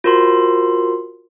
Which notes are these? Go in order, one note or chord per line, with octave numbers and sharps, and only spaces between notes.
F4 F#4 A#4 C5 C6